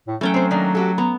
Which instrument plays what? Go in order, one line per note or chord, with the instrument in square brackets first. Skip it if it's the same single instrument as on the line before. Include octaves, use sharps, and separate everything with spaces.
[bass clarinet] A2
[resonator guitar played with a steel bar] E3 [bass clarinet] F#3 [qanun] A3 C#4 G5
[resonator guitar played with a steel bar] C4 C5
D#3 A#3 D4
F#4 G4 A4
[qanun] B3 [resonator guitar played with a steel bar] A#5